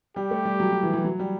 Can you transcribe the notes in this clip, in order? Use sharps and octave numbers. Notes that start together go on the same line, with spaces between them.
G3 G4
A3
G3
F#3
F#3
E3
E3
F#3
G3